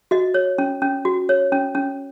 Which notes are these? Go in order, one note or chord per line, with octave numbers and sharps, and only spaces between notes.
F#4 D#5
C#5
C#4
C#4
F#4
C#5
C#4
C#4